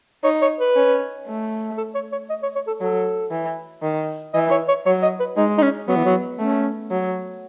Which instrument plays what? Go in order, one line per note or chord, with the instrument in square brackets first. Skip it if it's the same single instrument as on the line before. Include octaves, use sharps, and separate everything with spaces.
[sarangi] D#4 [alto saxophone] C#5
[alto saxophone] C#5
B4
[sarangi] C#4
A3
[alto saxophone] A4
C#5
C#5
D#5
C#5
C#5
A4
[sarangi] F#3 [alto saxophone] A4
[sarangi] E3
D#3
[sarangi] E3 [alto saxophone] D#5
[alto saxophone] C#5
C#5
[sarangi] F#3 [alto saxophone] C#5
[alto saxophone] D#5
B4
[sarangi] G#3 [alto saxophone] D#4
[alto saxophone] D#4
C#4
[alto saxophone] F#3 [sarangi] B3
[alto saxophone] E3
F#3
[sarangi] A3 [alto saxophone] C#4
[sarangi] F#3